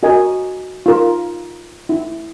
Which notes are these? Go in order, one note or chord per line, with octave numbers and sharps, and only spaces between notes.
F#4 A#4 D#5 G#5
F4 A#4
E4